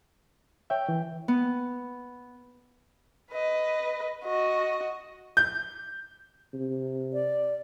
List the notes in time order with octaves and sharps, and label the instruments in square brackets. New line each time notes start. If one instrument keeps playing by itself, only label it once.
[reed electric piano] C#5 E5 [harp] G5
[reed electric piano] E3
[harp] B3
[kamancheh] B4 D#5
F#4 D#5
[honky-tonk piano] G6
[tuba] C3
[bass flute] D5